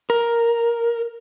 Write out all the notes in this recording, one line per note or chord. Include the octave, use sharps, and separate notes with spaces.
A#4